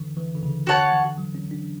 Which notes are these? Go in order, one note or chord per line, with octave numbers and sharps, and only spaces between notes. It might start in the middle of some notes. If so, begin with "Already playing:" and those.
Already playing: D3 E3
E3
D3
C#3
D3 F#4 C#5 F#5 A5
E3
F#3
C#4
D4